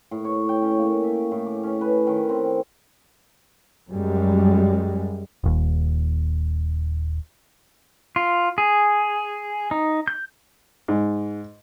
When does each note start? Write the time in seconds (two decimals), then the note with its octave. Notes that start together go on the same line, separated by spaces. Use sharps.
0.11 A2
0.24 C#5
0.49 G5
0.62 C#4
0.79 A#3
1.03 E5
1.31 A2
1.46 D6
1.63 C#4
1.81 B4
2.07 D#3
2.29 C4
3.90 F#2 G3 G#3
5.44 D#1 D#2
8.16 F4
8.58 G#4
9.71 D#4
10.08 G6
10.88 G#2